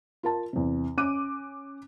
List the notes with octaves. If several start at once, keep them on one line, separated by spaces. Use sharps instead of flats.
F4 A#4 A5
E2 C3
C#4 D6 F#6 D#7